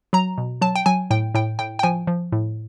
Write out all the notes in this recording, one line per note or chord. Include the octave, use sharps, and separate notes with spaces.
F#3 A#5
B2
F#3 A5
G5
F#3 G#5
A2 G5
A2 G5
A2 G5
G5
F3 G#5
F3
A2